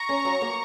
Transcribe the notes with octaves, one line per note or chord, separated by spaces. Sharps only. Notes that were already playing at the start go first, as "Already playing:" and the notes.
Already playing: A#5 C#6
C#4
F#3
A#3